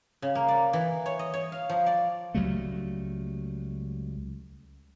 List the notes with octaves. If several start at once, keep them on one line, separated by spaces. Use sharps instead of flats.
C#3
A#3
D5
E3
C#5
D#5
C#5
F5
F3
D5
C#2 F#3 G3 A3